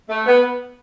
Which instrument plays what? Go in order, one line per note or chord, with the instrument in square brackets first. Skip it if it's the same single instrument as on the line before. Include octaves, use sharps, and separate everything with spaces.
[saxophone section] A3
B3